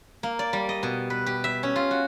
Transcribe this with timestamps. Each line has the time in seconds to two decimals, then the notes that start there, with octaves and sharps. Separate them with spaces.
0.23 A#3
0.39 D5
0.53 G3
0.69 D#5
0.83 B2
1.10 B4
1.26 G4
1.44 E5
1.63 C#4
1.76 F4
1.91 F#4